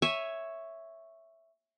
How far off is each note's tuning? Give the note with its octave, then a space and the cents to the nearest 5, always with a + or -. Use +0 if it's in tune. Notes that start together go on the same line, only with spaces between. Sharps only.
C#5 +0 E5 +0 G#5 +0